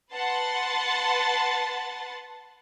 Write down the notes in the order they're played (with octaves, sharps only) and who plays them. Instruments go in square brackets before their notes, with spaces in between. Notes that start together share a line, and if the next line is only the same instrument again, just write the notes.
[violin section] B4 F#5 A5 C6 A6